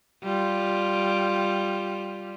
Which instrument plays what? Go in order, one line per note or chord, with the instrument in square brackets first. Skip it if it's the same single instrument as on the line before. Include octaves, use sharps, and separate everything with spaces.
[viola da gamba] G3 F4